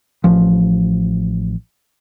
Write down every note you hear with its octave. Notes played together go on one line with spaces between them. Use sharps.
A1 F3